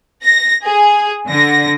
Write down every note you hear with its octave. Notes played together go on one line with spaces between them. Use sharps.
A#6
G#4
D3 A#6